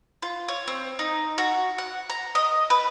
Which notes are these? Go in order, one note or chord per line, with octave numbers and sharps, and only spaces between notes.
F4
C#5
C4
D#4
F#4
F#5
A#5
D#5
B4